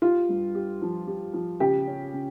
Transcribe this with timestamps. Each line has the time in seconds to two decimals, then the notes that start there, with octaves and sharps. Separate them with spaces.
0.02 F4 G4
0.29 G2
0.55 G4
0.82 F3
1.07 G4
1.34 F3
1.60 C#3 G4
1.87 C#4
2.14 C#3